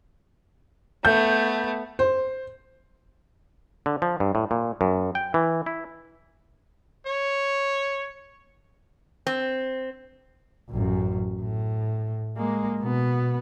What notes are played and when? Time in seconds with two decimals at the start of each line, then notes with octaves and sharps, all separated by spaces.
1.05 A3 B3 G6
1.99 C5
3.86 D3
4.02 F3
4.20 G2
4.35 A2
4.51 A#2
4.81 F#2
5.15 G5
5.34 E3
5.66 E4
7.07 C#5
9.27 C4
10.70 A1 F#2
11.42 A2
12.37 G#3 A#3
12.81 B2 B3